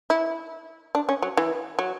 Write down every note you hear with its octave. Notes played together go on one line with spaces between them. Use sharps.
E4
D4
C#4
F#3
E3
F#3